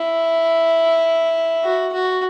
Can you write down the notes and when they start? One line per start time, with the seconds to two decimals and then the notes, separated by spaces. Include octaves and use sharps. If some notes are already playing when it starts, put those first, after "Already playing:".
Already playing: E4
1.64 F#4
1.93 F#4